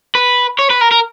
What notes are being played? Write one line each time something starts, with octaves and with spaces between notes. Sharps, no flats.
B4
C#5
B4
A#4
A#4